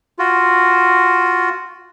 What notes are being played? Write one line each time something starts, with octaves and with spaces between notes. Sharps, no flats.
F4 F#4